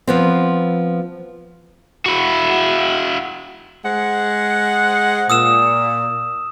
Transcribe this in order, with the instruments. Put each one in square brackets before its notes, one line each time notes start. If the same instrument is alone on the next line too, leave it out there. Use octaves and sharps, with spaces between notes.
[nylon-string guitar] F3 B3 C4
[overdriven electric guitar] E4 F#4
[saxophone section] G#3 C5 F#5
[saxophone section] A#2 [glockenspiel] D#6 E6 E7